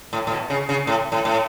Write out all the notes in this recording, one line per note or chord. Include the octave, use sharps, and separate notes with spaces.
A2
A2
B2
C#3
C#3
A2
A2
A2